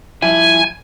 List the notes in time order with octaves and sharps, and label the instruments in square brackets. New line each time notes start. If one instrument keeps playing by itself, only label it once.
[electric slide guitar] F3 G3 E4 [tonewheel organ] G#5